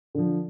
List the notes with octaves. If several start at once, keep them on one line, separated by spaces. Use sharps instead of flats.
D3 F3